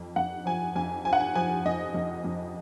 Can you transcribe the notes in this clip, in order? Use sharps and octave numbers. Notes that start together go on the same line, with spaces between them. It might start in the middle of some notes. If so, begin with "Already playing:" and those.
Already playing: F2
F2 F#5
F3 G#5
F2 G#5
F3 G#5
F#5
G#5
F3 G#5
F2 D#5
F2
F2